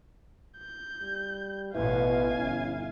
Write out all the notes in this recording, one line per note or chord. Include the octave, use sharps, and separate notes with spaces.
G6
G3
A1 B2 E4 B4 F5 G#5
G1 C#4